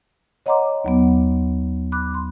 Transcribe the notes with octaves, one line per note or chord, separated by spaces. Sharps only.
C#5 D#5 F#5 A#5 C6 D6
D#2 F#3 B3
B5 D6 F#6
C6